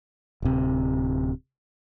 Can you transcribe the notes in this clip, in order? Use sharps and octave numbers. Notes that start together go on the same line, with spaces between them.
D1 C3